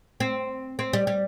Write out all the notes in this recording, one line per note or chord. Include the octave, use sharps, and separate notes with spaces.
C4
C4
G3
G3